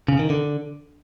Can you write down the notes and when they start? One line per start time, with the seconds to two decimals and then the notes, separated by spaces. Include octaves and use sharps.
0.08 C#3
0.19 D#3
0.30 D3